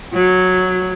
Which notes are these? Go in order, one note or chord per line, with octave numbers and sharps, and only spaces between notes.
F#3